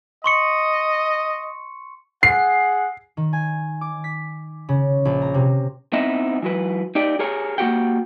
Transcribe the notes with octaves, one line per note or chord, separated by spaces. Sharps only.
D#5 C6 C#6 C#7
G#4 F#5 C7
D#3
G#5
D6
B6
C#3
A#1
A#5
C3
B3 C4 D#4 E4 D#5 E5
E3 F#3 B4
D#4 G4 D5
G4 G#4 A#4 C#5 G#5
A#3 B3 F#4 G4 F#5 G5